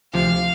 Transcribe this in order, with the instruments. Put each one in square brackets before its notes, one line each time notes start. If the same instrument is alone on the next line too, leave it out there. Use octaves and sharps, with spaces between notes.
[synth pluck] D2 C3 F3 [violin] F5